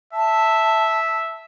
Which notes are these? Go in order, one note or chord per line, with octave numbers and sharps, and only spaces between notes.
E5 A5